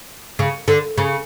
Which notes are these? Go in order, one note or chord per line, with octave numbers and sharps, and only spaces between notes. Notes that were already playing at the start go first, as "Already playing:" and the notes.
C#3
D3
C#3